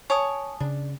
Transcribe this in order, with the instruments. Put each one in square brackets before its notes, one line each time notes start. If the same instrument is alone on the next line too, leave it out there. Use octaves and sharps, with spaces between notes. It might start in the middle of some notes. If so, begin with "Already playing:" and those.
[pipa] C#5 [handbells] G#5 A5 D#6
[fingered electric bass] C#3 [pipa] D4